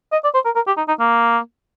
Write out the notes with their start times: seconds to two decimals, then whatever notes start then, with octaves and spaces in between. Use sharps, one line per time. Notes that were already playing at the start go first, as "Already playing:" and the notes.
0.12 D#5
0.24 D5
0.34 C5
0.45 A#4
0.55 A#4
0.67 G4
0.77 D#4
0.88 D#4
0.99 A#3